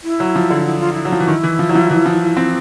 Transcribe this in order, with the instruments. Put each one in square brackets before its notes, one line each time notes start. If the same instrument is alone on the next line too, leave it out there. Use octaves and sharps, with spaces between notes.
[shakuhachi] E4
[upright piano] F#3
F3
D3
[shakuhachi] E4
F4
E4
[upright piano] F#3
F3
E3
D#3
E3
F3
F#3
F3
E3
F3
C4